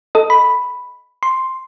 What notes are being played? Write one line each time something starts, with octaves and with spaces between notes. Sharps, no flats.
A4 D#5
B5
C6